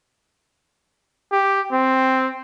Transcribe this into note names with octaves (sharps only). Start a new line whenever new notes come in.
G4
C4